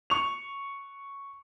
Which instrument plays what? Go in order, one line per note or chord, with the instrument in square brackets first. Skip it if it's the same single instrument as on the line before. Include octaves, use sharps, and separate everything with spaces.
[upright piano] C#6 F7